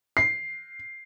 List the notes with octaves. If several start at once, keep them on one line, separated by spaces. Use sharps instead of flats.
C7